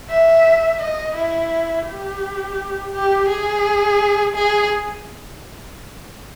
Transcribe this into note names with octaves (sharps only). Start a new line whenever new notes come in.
E5
D#5
E4
G4
G4
G#4
G#4